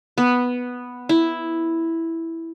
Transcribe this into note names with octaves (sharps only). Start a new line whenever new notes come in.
B3
E4